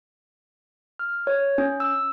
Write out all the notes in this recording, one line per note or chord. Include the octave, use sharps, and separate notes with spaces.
F6
C#5
C#4
E6